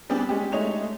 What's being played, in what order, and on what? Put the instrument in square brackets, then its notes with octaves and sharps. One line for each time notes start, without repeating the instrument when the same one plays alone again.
[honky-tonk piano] G3 B3 C4 D4 G4 G#4
G#3 C#4 G4
G#3 A3 D#4 C#5 F7